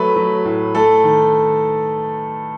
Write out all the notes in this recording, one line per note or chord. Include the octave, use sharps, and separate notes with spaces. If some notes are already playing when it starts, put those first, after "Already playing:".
Already playing: F#3 A3 B4
F#3
A2
A3 A4
D#3